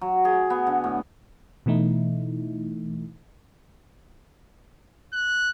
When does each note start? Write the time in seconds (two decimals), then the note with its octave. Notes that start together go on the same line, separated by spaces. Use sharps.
0.01 F#3
0.25 G#4
0.50 B3
0.67 D3
0.84 A2
1.66 B2 E3 A3 D#4 E4
5.13 F#6